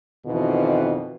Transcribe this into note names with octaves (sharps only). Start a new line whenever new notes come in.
F2 B2 D#3 E3